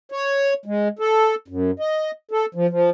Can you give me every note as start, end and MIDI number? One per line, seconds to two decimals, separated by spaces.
0.12 0.53 73
0.66 0.88 56
0.99 1.35 69
1.48 1.71 42
1.80 2.11 75
2.31 2.46 69
2.55 2.67 53
2.70 2.90 53